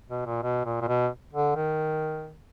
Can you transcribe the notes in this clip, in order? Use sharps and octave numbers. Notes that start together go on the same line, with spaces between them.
B2
A#2
B2
A#2
A#2
B2
D3
D#3